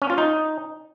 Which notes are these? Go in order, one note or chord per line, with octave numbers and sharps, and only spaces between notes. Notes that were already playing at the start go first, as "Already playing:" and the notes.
C#4
F4
D#4